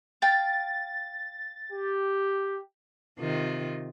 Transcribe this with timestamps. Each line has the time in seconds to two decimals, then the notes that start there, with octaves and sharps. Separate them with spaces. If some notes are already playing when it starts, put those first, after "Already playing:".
0.22 F5 G5 A6
1.72 G4
3.20 C3 D#3 F4